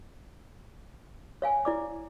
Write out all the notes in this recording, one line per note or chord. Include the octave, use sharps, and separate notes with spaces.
C#5 F5 G#5
E4 D5 D6